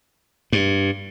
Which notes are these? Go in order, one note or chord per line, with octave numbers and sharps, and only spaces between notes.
G2